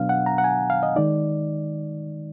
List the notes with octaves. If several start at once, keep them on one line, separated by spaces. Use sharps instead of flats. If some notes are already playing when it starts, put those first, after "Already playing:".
Already playing: B2 F#3 B3 D4 F5
F#5
A#5
F#5
G#5
F5
D#5
D#3 G#3 D#4 D5